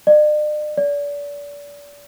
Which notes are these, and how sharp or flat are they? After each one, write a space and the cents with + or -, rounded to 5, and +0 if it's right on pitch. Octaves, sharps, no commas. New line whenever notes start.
D5 +45
D5 -30